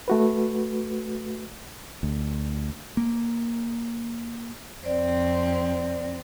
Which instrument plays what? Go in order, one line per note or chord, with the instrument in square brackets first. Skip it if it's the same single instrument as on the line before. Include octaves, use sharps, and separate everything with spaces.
[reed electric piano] A3 F#4 B4
[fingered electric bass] D2
A#3
[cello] F2 C4 [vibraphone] C5 D5